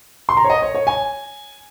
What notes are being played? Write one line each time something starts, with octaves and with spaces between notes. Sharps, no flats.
C6
A#5
C#5
D#5
C#5
C#5
G#5